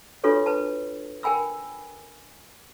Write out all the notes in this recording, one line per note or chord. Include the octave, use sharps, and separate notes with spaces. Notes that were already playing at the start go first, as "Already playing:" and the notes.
D4 F4 F#4 A4 B4 C#5
B4 A5
A#4 G5 G#5 B5 E6